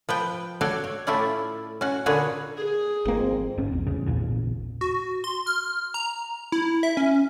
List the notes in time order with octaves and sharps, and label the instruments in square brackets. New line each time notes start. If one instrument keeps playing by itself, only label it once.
[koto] F3 B4 G5
F#4 A4 C#5 D5 F5 G5
C#5
A2 A3 C#4 E4 F4 D5
C#4 F#4
A#2 D3 F#4 G#4 B4 C#5
[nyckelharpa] G#4
[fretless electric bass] G#1 A#3 [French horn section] F2 G#3 C4
[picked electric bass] G1 G#2 C4 C#4
A#1 E2
E2 C#3
A1 E2 A#2 C#3
[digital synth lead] F#4
C6
F6
A#5
E4
E5
C#4